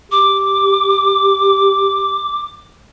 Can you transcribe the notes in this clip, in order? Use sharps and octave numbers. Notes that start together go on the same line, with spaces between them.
G4 D6